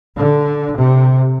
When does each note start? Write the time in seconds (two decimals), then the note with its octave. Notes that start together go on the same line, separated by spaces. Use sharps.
0.16 D3
0.78 C3